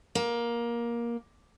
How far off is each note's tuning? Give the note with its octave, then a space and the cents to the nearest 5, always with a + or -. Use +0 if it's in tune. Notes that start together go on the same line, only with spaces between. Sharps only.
A#3 +15